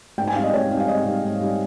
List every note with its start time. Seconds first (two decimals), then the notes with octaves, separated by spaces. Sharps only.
0.18 G#2 G5
0.28 G#5
0.35 G3 C4 D#4 F5
0.44 D#5
0.53 G#2 C#5
0.71 G3 C4 D#4
0.80 F5
0.87 G#2 D#5
1.05 G3 C4 D#4
1.23 G#2
1.41 G3 C4 D#4